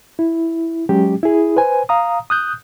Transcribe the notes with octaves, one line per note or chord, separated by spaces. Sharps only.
E4
F#3 G#3 C#4 G4
E4 G#4
B4 C5 G#5
F5 A#5 D#6
D#6 F#6 G6